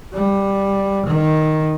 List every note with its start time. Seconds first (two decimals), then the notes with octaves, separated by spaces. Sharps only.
0.14 G3
1.07 D#3